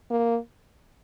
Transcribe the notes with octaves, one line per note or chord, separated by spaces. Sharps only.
A#3